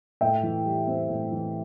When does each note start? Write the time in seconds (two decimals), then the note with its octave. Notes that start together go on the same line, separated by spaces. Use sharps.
0.21 A2 E5 G5
0.43 E3
0.65 G3
0.88 C4
1.09 A2
1.31 E3